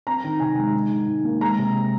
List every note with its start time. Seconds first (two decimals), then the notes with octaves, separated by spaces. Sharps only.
0.07 C4 A#5
0.24 D#3
0.40 C3 G#5
0.58 G#3
0.74 D#4
0.90 D#3
1.07 G#2
1.24 A#3
1.41 G#3 A#5
1.58 C3